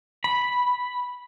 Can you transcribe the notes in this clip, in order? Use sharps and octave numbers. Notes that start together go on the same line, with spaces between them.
B5